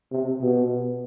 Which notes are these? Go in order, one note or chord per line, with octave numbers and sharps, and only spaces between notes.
C3
B2